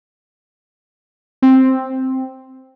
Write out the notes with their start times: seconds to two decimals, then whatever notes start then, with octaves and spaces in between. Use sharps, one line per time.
1.42 C4